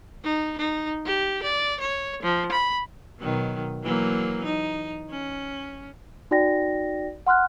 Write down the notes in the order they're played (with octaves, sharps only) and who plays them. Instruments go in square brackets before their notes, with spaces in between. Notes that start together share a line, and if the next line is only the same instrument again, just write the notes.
[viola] D#4
D#4
G4
D5
C#5
F3
B5
[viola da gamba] B2 D#3 F#3
E3 F#3 A#3
D#4
C#4
[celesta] D#4 F#4 D5 G5 A#6
F#5 C6 F6 F#6